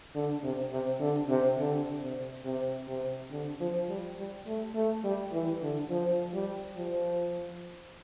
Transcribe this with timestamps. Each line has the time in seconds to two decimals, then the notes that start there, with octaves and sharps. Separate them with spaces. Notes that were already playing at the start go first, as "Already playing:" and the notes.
0.15 D3
0.43 C3
0.72 C3
1.00 D3
1.29 C3
1.58 D3
2.02 C3
2.45 C3
2.88 C3
3.31 D3
3.60 F3
3.89 G3
4.18 G3
4.46 A3
4.75 A3
5.04 G3
5.33 E3
5.62 D3
5.90 F3
6.33 G3
6.76 F3